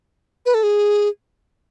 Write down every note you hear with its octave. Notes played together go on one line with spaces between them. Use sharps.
B4
A4
G#4